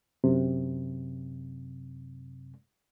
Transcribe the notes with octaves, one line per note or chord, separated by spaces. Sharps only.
F#2 C3